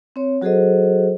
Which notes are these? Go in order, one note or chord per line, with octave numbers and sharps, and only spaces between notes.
C4 C#5
F#3 F#4 G#4 A4 C5 D#5